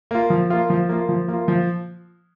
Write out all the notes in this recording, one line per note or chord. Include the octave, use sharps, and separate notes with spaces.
A#3 F4
F3
A#3 F4
F3
A#3 F4
F3
A#3
F4
F3